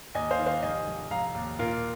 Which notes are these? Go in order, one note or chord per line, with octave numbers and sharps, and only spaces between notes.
D#2 D#5 G#5
C5 F5
D#3
C5 F5
F1 D#5 G#5
F1
F1 F5 A#5
D#2
A#2 F4 A#4